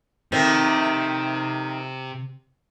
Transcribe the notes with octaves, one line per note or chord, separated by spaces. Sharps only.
C3 D#3 F3 A3